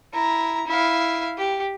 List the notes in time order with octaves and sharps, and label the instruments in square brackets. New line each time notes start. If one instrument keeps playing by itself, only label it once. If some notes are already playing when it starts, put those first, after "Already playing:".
[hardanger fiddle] E4 A#5
E4 F5
G4